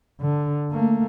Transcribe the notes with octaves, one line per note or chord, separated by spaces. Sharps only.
D3
A3 A#3